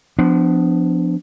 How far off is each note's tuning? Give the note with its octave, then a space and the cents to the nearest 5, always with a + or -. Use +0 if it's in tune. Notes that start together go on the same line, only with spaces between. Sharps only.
F3 +0 B3 +30 D4 +0